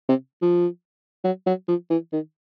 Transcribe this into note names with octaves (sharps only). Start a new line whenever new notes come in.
C3
F3
F#3
F#3
F3
E3
D#3